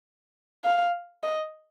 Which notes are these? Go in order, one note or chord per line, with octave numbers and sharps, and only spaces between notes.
F5
D#5